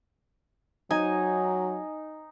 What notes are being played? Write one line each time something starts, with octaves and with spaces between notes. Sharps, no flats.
F#3 D#4 G#5